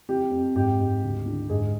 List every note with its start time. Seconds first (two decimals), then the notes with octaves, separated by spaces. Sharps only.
0.09 F2 G4
0.31 F2
0.55 G#2 G4
0.80 G#2
1.03 D2
1.26 D3
1.49 G#2 G#4